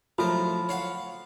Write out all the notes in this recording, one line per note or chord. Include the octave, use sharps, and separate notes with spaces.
A2 F3 F#3 A#4 B5
C#5 F5 F#5